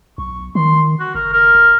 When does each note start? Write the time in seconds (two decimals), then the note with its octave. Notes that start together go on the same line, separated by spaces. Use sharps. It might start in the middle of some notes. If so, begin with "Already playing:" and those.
0.18 B1 C#6
0.55 D#3 C6
1.00 F#4
1.15 F#1 A#4
1.33 A#4
1.55 D#1